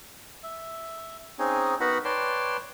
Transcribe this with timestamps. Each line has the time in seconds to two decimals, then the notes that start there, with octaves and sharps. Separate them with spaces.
0.43 E5
1.39 C4 C#4 D#4 G#4
1.80 B3 D#4 F#4 A#4 F#5 B5
2.05 B4 C#5 D5 G5 A5 C6